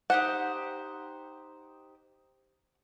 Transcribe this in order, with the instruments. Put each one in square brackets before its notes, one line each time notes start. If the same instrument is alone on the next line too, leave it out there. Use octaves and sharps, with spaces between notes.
[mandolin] D#4 G4 C5 [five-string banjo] F#5